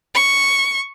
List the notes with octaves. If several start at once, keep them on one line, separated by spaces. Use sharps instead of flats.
C#6